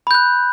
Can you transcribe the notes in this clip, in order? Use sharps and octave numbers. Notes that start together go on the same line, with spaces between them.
B5 F#6 G6